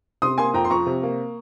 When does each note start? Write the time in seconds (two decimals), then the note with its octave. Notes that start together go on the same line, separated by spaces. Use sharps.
0.22 C3 C6 D#6
0.38 A#3 G#5 C6
0.54 F2 G5 A#5
0.65 C6
0.70 F3 A#5 C#6
0.86 C3
1.03 A#3